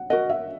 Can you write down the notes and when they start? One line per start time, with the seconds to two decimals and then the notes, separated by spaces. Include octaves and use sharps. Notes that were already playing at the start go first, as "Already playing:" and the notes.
Already playing: F#5
0.10 F#4 A#4 D#5 F#5
0.30 E5